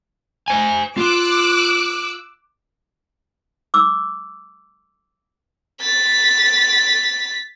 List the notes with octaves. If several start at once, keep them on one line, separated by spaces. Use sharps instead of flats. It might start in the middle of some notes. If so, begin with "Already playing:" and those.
C5 G#5
F4 D6 E6 F#6
D6 E6
A6 B6